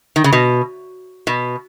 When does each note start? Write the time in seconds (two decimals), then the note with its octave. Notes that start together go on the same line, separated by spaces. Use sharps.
0.16 D#3
0.24 C#3
0.33 B2
1.27 B2